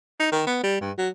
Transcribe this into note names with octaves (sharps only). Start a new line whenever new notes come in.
D#4
D#3
B3
G3
G2
F#3